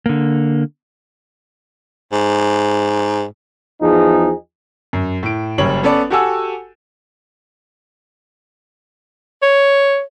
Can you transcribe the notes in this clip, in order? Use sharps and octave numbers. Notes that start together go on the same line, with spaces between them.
D3 A#3
G#2
E2 F3 D#4 G#4
F#2
A2 D7
F#1 F#2 G3 C#4 C#5 F#7
B3 C#4 A4 B4 D5
F#4 G4 A4 F#5 G#5 E6
C#5